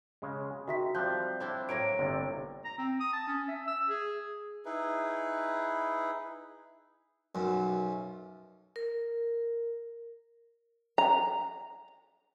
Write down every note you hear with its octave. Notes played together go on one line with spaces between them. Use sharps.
C#3 G#3
D#3 F#4 E5 B6
F3 G3 C4 F#6 G6
C4 D4 E4
A2 A#3 C#5 A#6 D7
G1 C3 G3
A#5
C4
D#6
A5
C#4
E5
E6
G#4
D#4 E4 G#4 B4
B1 F#2
A#4
A#5